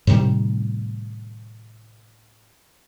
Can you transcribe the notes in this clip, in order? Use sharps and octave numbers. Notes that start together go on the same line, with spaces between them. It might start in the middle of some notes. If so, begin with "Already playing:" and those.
A2 C3 D#3 G3